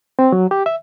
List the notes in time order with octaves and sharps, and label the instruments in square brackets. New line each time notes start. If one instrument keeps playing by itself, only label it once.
[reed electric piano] C4
F#3
G4
E5